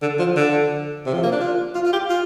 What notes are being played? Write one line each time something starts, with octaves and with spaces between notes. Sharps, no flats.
D3
F3
D3
C3
F3
A#3
D4
F4
F4
F4
G4
F4